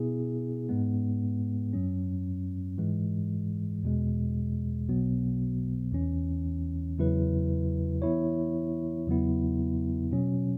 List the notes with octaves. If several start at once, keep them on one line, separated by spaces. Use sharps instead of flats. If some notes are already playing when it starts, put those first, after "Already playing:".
Already playing: B2 B3 E4 G#4
G#2 G#3 B3
F#2 F#3 C#4
G#2 E3 G#3
E2 B2 G#3
B1 B2 F#3 B3
E2 E3 C#4
E2 C#3 F#3 E4 B4
E3 B3 E4 C#5
E2 C#3 F#3 B3 E4
B2 F#3 C#4